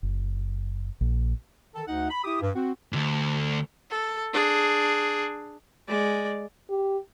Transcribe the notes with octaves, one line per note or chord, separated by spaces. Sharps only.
F#1
A#1
D#3 A4
D2 D#4 F#5
B5
E4 G4 D6 D#6
G2
C4 F#4
D2 G#2
A4
D4 G#4
G#3 D5
G4